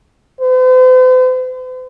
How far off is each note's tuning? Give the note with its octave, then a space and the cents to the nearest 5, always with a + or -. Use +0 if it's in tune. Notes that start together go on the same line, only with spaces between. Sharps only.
C5 -45